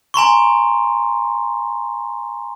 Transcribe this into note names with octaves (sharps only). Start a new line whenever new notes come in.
G#5 A#5 C6 C#6